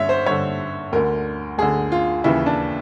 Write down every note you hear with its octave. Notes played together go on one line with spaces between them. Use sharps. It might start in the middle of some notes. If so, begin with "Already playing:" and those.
Already playing: G2 D3 C#5 E5
C5
G2 D3 C#5
D2 D3 A#4
D2 D3 G#4
F4
D#2 C#3 E3 E4
D4